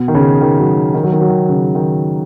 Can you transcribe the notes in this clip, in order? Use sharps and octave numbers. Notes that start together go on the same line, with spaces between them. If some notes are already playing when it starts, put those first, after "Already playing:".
Already playing: B2
D#3
C#3
D#3
F#3
D#3
F#3
D#3
F#3
D#3
C#3
D#3